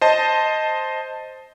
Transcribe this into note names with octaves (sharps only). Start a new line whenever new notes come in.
C5 D#5 A5